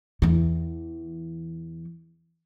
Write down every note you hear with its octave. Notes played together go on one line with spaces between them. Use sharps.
E2 E3